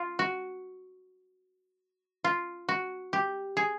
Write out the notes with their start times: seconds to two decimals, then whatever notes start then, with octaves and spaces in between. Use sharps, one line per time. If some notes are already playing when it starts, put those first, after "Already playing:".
Already playing: F4
0.19 F#4
2.24 F4
2.69 F#4
3.13 G4
3.57 G#4